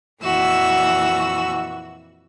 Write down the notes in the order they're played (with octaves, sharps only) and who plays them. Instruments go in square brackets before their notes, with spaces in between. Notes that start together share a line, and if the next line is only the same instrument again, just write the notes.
[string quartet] F2 A#2 E3 F#4 E6